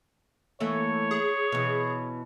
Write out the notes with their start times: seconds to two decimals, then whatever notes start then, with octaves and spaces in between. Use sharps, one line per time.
0.60 E3 A3 A#3 C#5
1.11 G#4
1.52 B2 E3